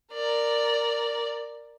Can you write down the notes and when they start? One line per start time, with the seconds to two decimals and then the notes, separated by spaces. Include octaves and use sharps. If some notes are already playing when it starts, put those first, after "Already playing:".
0.12 A#4 D5